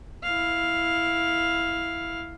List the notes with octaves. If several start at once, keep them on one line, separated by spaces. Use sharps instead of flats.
E4 F5